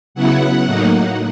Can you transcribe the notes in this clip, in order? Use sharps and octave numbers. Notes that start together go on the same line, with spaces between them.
C#3 F#3 B3 E4 F#5
A2 F#3 A#3 D#4